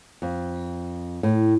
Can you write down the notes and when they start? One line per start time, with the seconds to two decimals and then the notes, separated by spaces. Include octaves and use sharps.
0.22 F2
1.23 A2